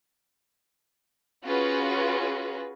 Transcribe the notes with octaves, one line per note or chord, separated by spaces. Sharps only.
C#4 F4 F#4 G#4 B4